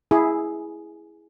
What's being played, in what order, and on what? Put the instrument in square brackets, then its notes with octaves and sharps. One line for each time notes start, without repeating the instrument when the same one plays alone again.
[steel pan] E4 G#4